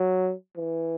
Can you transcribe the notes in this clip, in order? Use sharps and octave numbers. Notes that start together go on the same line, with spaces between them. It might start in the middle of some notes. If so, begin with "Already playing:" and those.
Already playing: F#3
E3